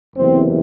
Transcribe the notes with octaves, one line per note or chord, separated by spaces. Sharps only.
F#1 E2 C3 E3 C4